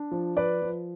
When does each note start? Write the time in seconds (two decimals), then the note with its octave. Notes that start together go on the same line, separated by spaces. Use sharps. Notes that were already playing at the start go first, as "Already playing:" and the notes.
Already playing: D4
0.11 F3
0.37 F3 B4 D5
0.62 F3